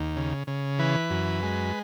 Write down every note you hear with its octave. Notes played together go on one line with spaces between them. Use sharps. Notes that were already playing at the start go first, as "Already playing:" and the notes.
Already playing: D#2
C#3
C#3
E3 B4
F#2
G#3